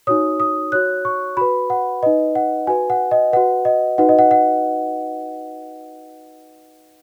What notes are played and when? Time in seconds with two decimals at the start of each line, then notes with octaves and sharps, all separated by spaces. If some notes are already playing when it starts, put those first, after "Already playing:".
0.07 D#4 F#4 C#5 D#6
0.40 D#6
0.72 F#4 C#5 F#6
1.05 C#6
1.37 F#4 B4 B5
1.70 F#5
2.03 D#4 B4 D#5
2.35 F#5
2.67 F#4 B4 G#5
2.90 F#5
3.11 D#5
3.33 F#4 B4 F#5
3.65 D#5
3.98 D#4 F#4 B4 F#5
4.09 D#5
4.19 F#5
4.31 F#5